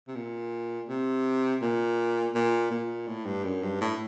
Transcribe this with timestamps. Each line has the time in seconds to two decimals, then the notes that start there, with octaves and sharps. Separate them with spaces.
0.08 C3
0.16 A#2
0.89 C3
1.62 A#2
2.35 A#2
2.71 A#2
3.07 A2
3.26 G2
3.44 F#2
3.62 G2
3.81 A2